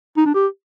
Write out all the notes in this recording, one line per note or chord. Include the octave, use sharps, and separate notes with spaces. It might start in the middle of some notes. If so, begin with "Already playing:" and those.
D#4
D4
G4